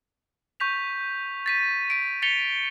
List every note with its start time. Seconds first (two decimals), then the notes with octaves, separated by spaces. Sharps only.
0.60 C#6 G6 B6 F7
1.46 A6 B6 D#7
1.90 B6 D7
2.22 A6 B6 C#7 F7 G7